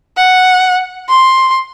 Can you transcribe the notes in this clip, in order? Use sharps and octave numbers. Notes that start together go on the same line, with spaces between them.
F#5
C6